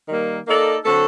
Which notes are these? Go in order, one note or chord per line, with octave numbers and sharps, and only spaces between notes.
D#3 G3 A#3
A#3 D#4 A4 D5
D3 F#3 C4 F#4 A4